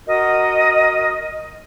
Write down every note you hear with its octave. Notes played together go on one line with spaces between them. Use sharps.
F#4 A#4 D#5